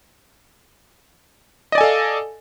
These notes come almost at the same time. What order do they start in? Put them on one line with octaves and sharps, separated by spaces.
D#5 D5 G#5 A4 F5